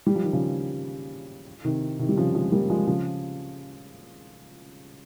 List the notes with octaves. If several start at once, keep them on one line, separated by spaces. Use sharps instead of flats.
G3
F3
D#3
C#3 F3
C3 D#3
C3 D#3
G3
C#3 F3
F3 G#3
G3 A#3
F3 G#3
C#3 F3